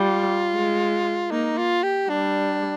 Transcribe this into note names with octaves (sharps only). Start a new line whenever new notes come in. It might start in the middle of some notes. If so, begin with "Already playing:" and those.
Already playing: G3 F4
G#3
A#3 D#4
F4
G4
G3 D4